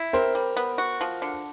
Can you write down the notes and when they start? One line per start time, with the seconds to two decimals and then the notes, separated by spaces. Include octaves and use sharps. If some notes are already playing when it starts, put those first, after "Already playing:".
Already playing: E4
0.13 C4 A#4 C5
0.35 G3
0.57 B3
0.78 F#4
1.01 F3
1.22 D3